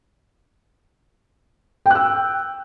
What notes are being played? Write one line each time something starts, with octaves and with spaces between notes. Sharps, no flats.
G5 E6 F#6